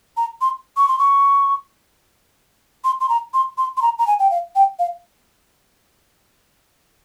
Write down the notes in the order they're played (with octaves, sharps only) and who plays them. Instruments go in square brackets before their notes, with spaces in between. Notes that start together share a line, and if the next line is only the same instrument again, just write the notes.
[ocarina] A#5
C6
C#6
C6
C#6
C6
C6
A#5
C6
C6
C6
A#5
A#5
G#5
G5
F5
G5
F5